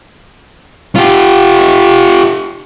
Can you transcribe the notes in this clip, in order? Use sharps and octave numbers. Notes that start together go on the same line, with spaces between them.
F4 G4